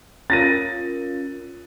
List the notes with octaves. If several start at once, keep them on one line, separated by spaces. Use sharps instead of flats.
C#4 F4 A#4 A6 A#6 D#7